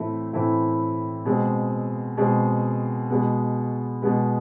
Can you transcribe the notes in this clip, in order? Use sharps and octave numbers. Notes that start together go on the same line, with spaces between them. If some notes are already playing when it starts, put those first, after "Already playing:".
Already playing: A2 E3 A3 C4 E4
A2 E3 A3 C4 E4
B2 G#3 C4
B2 G#3 C4
B2 G#3 B3
B2 G#3 B3